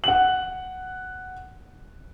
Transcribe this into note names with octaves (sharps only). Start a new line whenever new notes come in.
F#5 F#7